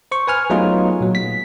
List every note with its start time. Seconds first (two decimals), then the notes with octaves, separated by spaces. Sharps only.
0.11 C5 C#6
0.27 B4 G#5 F6
0.50 F#3 A3 B3 D#4 F4 G#4
1.01 A#2 F#3
1.15 B6